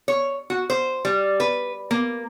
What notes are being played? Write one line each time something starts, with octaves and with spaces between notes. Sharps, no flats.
C#5
F#4
C5
G3
B4
A#3